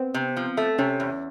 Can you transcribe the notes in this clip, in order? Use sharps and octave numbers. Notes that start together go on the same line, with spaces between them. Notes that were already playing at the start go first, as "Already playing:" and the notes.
Already playing: B3 C4
C3
F3
A3
C3 C#4
E2